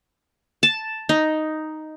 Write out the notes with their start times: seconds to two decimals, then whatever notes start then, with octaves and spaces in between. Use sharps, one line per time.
0.63 A5
1.09 D#4